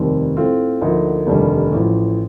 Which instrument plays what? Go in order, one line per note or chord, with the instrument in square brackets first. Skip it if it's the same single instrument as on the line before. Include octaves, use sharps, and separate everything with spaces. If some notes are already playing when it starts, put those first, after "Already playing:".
Already playing: [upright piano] F1 D#2 D#3 G3 C4
A2 A3 C4 F4
D2 D3 F3 A#3 D#4
F1 D#2 D3 G3
A1 A2 F3